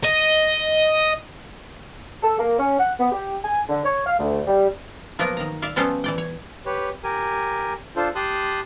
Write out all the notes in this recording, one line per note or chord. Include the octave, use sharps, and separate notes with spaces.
D#5
A4
A#3
C#4
F#5
B3
G4
G#5
D3
C#5
F5
D2
G3
F3 F#3 A#3 B3 A#4
D#3 A#5
D5 E5 F5
F3 G3 B3 C#4 A4 C5
E3 D5 G5
C#5
G4 B4 C#5
G4 A#4 G#5
D4 F4 A4 C5
G4 A5 C6 D#6 F#6